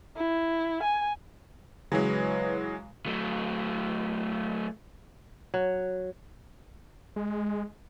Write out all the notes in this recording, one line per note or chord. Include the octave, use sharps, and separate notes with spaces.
E4
G#5
C#3 E3 F#3 G#3 B4 C#5
F#3 A3
F#3
G#3